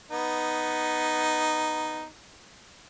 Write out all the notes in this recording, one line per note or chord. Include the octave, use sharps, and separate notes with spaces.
B3 D#4